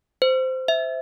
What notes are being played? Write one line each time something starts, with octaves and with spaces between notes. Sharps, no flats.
C5
E5